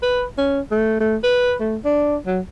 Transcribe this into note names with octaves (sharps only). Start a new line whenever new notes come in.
B4
C#4
A3
A3
B4
A3
D4
F#3